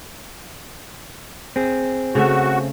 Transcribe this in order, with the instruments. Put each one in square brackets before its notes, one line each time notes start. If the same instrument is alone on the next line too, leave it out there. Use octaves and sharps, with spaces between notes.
[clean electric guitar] C4 G#4
[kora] C#3 A3 E5 [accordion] F#4